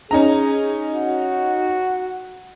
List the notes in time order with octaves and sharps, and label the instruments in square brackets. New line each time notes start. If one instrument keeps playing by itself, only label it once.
[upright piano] C#4 D#4 A#5 [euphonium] G#4
[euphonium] F#4